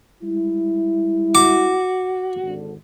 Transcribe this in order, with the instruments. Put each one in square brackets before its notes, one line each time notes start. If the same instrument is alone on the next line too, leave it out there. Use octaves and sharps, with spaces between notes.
[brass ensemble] G3 G#3 E4
[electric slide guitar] F#4 [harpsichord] D6
[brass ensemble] G#1 D3